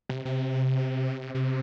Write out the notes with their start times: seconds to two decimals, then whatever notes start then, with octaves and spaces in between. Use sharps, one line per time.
0.09 C3
0.25 C3
1.35 C3